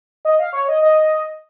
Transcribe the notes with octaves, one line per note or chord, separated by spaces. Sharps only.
D#5
F5
C#5
D#5
D#5